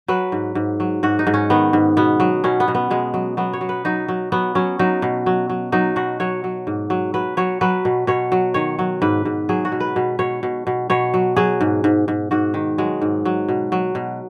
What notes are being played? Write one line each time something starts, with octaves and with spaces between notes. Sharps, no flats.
F#3 B4
G#2
G#2
F#3
G#2 F#4
D#4
G#2
C#4
D#3 B3
G#2
B2 B3
F#3
B2 C#4
B3
B2
B3
B2 G#3
F#3
F#3 B3
C#5
F#3
B4
F#3 D#4
F#3
F#3 B3
F#3 C#4
F#3 D#4
B2
F#3
F#3
F#3 D#4
B2 F#4
F#3 C#5
F#3
G#2
F#3
F#3 B4
F#3 C#5
F#3 B4
B2
B2 C#5
F#3
D#3 C#5
F#3
G#2 B4
G#2
F#3 G#4
F#4
B2
B4
B2
B2 C#5
B2
B2
B2 C#5
F#3
F#3 G#4
G#2
G#2
G#2
G#2 F#4
D#3
F#3 G#3
G#2
F#3
B2
F#3
B2